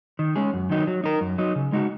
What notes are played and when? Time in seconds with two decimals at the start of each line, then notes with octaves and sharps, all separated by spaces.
0.19 D#3
0.36 G#3 C#4 G#4
0.53 F#2
0.70 D#3 F#3 D#4
0.87 F#3
1.04 D#4 A#4
1.21 F#2
1.38 F#3 D#4
1.56 C#3
1.72 G#3 D#4 F#4